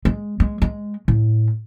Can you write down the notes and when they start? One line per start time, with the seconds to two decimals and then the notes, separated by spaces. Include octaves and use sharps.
0.05 G#3
0.40 G#3
0.62 G#3
1.08 A2